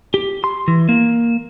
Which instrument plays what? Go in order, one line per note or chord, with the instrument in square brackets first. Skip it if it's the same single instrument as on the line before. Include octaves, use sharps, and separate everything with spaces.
[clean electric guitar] G4
C6
E3
A#3